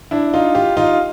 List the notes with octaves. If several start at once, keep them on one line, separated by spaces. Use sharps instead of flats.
D4 E4
D#4 F4
F4 G4
D#4 F4